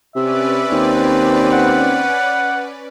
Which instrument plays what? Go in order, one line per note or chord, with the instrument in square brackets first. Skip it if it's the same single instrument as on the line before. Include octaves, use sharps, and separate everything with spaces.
[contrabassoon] C3 [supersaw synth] C#4 B4 D5 [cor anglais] E5
[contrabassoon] D#2 [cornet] C4
[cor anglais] F#5